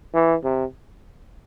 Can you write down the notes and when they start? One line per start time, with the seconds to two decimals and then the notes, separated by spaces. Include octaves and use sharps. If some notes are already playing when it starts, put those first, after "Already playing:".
0.14 E3
0.44 C3